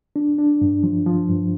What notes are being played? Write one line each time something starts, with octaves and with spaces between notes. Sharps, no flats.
D4
D4
G2
F3
F3
G2